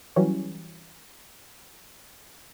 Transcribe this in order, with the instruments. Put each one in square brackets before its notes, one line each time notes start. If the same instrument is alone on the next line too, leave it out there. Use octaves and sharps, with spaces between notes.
[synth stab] E3 F#3 G3 C#4